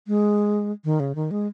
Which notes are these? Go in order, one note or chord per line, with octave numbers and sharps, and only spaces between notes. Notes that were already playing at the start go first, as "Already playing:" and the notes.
G#3
D#3
C#3
D#3
G#3